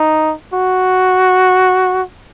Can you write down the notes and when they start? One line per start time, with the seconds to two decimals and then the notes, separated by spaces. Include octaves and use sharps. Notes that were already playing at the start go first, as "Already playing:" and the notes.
Already playing: D#4
0.54 F#4